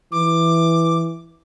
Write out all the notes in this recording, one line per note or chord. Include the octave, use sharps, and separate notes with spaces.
E3 D6